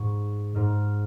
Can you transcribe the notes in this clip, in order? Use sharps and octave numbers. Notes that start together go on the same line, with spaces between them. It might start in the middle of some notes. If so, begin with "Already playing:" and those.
Already playing: G#2 C#6
G#2 F6